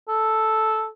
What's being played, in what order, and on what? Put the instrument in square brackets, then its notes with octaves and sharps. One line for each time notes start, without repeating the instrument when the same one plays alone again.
[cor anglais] A4